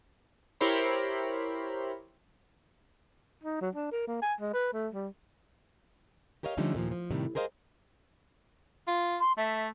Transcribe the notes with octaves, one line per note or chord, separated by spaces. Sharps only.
E4 G4 A#4 C5 C#5 B5
D#4
F#3
D4
A#4
A#3
G#5
G#3
B4
A3
G3
G4 A#4 C#5 D#5 F5
D3 F3 G3 A3 C#4 D#4
D#2 A#2 E3 F3
F3
A2 C3 D#3 G3
G#4 A#4 C5 D#5 F5
F4
C6
A3 E5